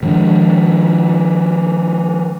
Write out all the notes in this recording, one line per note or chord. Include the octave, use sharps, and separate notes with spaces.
D#3 F3 G#3 D4